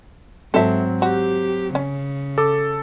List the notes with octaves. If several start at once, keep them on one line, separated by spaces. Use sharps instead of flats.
G#2 F#3 C4 A4 E5
F#4 G4
C#3 C#4
A4 D6